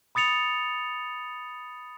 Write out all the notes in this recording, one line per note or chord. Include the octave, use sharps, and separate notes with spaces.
B5 D#6 A6 C#7 F7